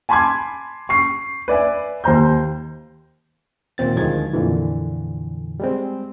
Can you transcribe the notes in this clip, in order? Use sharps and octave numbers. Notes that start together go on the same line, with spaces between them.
G#5 A5 B5 C6 D6 G#6
C#6 C7
B4 D5 E5 G#5
D#2 C5 A#5 G6
D#2 A#2 C4 A6
D2 D#3 F3 G#3 G#6 A6
F2 A#2 D3 E3
G3 G#3 C4